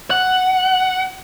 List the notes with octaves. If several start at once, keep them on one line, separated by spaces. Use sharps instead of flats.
F#5